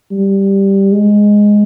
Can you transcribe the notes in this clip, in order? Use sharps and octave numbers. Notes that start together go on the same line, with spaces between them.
G3
G#3